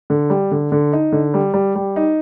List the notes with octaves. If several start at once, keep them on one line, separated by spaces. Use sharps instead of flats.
D3
G3
D3
D3
D#4
D3
G3
G3
G3
D#4